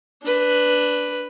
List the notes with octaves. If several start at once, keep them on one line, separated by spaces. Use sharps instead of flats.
D4 B4